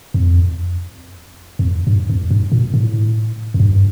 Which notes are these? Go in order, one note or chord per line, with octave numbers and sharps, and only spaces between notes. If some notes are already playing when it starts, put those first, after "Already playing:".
F2
F2
G2
F2
G2
A#2
A2
F2
G2